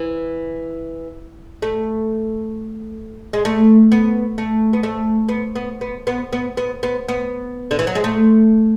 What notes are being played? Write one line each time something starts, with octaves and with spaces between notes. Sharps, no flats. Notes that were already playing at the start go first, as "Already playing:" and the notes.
Already playing: E3
A3
G#3
A3
B3
A3
B3
A3
B3
B3
B3
B3
B3
B3
B3
B3
D3
E3
F#3
G#3
A3